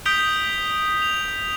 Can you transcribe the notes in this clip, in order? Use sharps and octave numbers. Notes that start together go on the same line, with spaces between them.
D#6 G6 B6 D7 F7 G7
F7